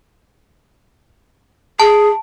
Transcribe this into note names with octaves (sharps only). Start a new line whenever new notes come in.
G#4 A5